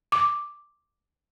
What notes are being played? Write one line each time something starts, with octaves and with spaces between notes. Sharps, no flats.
D6